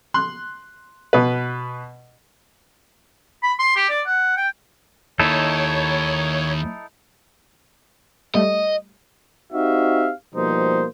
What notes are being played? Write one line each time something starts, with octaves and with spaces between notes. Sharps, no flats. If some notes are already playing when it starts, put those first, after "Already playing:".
C6 F#6
B2 B4
B5
C6
G4
D5
F#5
G5
D#2 D#4 E4 A4 C#5
G3 A3 D#5
C4 D#4 F#4 G4 E5 F5
B2 F3 G3 A#3 D#4 C5